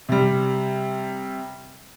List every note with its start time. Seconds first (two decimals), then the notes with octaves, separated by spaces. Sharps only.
0.09 C3 G3